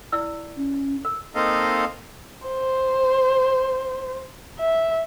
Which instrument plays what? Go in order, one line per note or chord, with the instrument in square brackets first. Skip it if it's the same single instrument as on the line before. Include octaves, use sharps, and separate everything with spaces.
[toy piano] E4 D5 E6
[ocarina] C#4
[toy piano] A#4
[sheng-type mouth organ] A#3 C4 D#4 A4 D#5 F5
[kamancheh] C5
E5